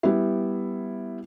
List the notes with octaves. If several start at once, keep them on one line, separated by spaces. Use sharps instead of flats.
G3 B3 E4